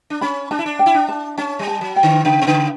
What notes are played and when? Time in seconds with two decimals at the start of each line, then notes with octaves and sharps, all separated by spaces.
0.10 D4
0.21 C#4 B5
0.51 D4 A5
0.59 E4
0.66 D4
0.79 G5
0.86 E4
0.94 D4
1.09 A5
1.38 C#4 A5
1.59 G3
1.67 A5
1.81 F#3
1.96 G5
2.03 D3
2.25 C#3 G5
2.41 B2
2.47 C#3 G5